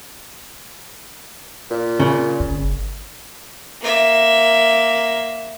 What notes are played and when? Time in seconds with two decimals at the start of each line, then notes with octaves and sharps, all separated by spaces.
1.70 A#2
2.00 C#3
2.40 G1
3.81 A#3 E5